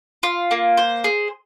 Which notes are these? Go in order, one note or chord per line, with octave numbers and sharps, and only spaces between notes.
F4
A#3
C5
G#4